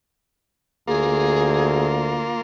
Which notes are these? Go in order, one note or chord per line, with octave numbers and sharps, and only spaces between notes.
D2 A#3 F4 G#4